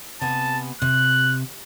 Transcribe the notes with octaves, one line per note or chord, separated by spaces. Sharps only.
C3 B3 G#5 A5
C3 F#6